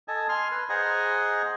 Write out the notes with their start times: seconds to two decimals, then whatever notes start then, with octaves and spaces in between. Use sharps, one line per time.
0.08 A4 D#5 G#5 A5
0.29 G#5 C6 F6
0.51 B4
0.69 G#4 C5 D#5 F#5 G#5 A#5